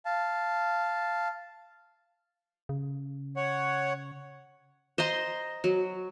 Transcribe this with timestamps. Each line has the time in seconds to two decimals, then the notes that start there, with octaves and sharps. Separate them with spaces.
0.05 F5 A5
2.69 C#3
3.37 C#5 F#5
4.98 C5 D#5 A#5 C6
5.64 F#3